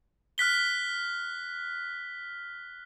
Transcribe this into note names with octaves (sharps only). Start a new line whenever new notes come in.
F6 F#6 B6 G7